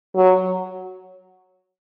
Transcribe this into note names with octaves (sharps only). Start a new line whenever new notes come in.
F#3